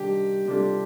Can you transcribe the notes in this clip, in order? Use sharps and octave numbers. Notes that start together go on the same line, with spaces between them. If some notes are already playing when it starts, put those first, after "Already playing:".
Already playing: C3 D#3 G3 D4 G4
C3 G3 D4 F4 A4